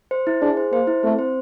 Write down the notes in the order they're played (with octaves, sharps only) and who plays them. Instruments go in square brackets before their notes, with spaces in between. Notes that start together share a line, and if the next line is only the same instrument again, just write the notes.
[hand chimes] C5
E4
[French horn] D4 [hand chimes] G#4
[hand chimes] C5
[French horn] A#3 [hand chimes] C5
[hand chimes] E4
[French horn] A3 [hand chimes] C4
[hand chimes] C5